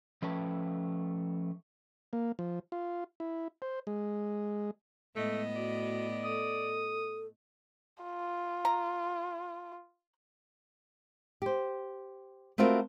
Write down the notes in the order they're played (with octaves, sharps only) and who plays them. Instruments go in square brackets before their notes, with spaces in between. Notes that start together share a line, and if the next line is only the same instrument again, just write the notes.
[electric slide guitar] F3 A3 C#4 B4 G5 A5
[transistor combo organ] A#3
F3
F4
E4
C5
G#3
[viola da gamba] A2 B3 D#5 [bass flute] G#3 [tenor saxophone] A3
[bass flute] F#4 [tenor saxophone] D5
[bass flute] A4 [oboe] D#6
[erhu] F4
[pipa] A#5
[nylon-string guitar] G4 C5
A3 B3 C4 F4 F#4 A#4